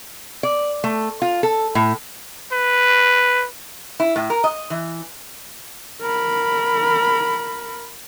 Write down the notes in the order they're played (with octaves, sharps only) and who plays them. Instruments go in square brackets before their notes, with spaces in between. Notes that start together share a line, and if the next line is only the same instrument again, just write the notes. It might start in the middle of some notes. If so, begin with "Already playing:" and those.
[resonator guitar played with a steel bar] D5
A3
F4
A4
A2
[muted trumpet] B4
[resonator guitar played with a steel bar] E4
A2
A#4
D#5
E3
[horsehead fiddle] A#4 B5